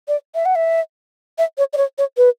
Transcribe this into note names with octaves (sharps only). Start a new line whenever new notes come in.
D5
E5
F#5
E5
E5
C#5
D5
C#5
C#5
B4